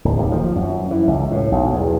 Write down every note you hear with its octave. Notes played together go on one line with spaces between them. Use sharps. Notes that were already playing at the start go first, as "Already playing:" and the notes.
D1
D#2
F3
F#2
E3
C#2
A2
B1
E2